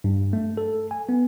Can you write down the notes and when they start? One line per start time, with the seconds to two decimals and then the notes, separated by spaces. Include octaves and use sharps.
0.04 G2
0.33 A3
0.57 A4
0.91 G#5
1.09 B3